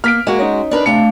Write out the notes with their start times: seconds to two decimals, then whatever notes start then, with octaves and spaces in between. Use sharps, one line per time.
0.04 A#3 F6 B6 D7
0.27 G#3 A#3 F#4
0.39 C#4 D#4
0.71 D4 A#4 B4
0.86 C3 A3 D4 F5